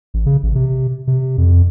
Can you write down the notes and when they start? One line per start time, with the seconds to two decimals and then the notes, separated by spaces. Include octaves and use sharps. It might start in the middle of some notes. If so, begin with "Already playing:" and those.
0.14 A1
0.26 C#3
0.43 A1
0.55 C3
1.07 C3
1.38 F2